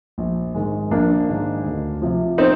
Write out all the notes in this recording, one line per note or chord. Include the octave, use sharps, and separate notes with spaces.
A#1
G#2 D#3 G#3
A#1 A#3 D4
G#2 D#3 G#3
D2
C3 F3
C4 D#4